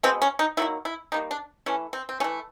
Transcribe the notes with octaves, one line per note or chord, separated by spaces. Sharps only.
B2 G#3 B3 C4
C#4
D#4
D#3 F#3 A#3 E4
E4
D#3 G3 A#3 D#4
D4
E3 A3 C#4
C4
C4
E3 A3 C#4